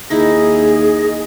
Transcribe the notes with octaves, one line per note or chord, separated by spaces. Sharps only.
D#2 D#4 E4 G#4 D#5